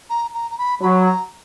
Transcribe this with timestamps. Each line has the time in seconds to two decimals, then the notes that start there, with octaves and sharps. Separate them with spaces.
0.10 A#5
0.34 A#5
0.51 A#5
0.58 B5
0.81 F#3 B5
1.01 B5
1.06 A#5